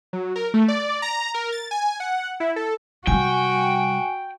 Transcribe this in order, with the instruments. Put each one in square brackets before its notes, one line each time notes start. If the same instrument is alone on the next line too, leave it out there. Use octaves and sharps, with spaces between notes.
[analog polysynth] F#3
A#4
A3
D5
A#5
A#4
A6
G#5
F#5
E4
A4
[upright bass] C3 G3 [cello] F#4 [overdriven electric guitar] G5 [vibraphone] G#5